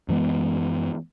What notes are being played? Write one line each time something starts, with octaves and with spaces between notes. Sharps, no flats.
F#2 E3 G#3 B3